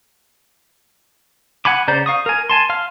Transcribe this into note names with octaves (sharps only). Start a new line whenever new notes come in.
F#5 G#5 B5 D6
C#3 C5 D5 A#5 G6
F5 C#6 D#6
A#4 G#5
G#5 A5 C6
F5 C6 F6